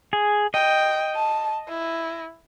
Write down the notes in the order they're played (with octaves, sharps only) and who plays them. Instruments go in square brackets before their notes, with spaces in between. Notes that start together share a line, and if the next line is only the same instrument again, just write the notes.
[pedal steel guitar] G#4
[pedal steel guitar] D#5 [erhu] G5
[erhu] A5
E4